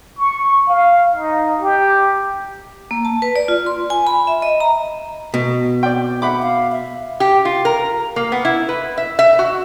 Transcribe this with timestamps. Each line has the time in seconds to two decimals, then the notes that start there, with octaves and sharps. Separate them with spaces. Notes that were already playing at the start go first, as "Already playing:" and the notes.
0.18 C#6
0.68 F5
1.15 D#4
1.60 G4
2.91 A#3
3.05 A5
3.22 B4
3.36 D5
3.48 F4
3.66 C6
3.90 G#5
4.07 B5
4.27 E5
4.42 D#5
4.60 A#5
5.34 B2
5.83 D5 G5
6.22 E5 F#5 B5 D6
6.42 F5
6.72 E5
7.20 G4
7.45 F4
7.65 A#4
8.16 A#3
8.32 B3
8.45 E4
8.69 B4
8.98 E5
9.19 E5
9.39 F#4